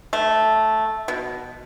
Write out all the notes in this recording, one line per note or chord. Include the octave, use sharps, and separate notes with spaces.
A3
B2